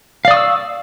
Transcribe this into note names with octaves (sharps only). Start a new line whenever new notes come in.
D5 F5 C#6 D#6 E6